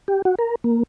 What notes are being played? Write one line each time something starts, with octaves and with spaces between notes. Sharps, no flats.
G4
F#4
A#4
A#3